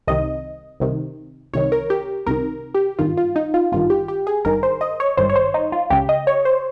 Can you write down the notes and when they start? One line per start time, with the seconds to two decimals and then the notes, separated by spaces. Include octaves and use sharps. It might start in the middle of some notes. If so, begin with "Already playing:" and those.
0.08 C2 C3 D#3 D#5
0.80 C2 C3 D#3
1.54 C2 C3 D#3 C#5
1.72 A#4
1.90 G4
2.26 C2 C3 D#3 A#4
2.75 G4
2.99 G#1 G2 D#3 F4
3.17 F4
3.36 D#4
3.54 F4
3.72 G#1 G2 D#3 F4
3.90 G4
4.08 G4
4.27 G#4
4.45 G#1 G2 D#3 A#4
4.63 C5
4.81 D#5
5.00 C#5
5.17 G#1 G2 D#3 C5
5.30 C#5
5.36 C5
5.54 D#4
5.72 F4
5.90 C#2 C#3 G4
6.09 D#5
6.27 C#5
6.45 C5